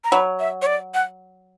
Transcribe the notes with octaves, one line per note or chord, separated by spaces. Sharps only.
A#5
F#3 B5
E5
C#5
D5
F#5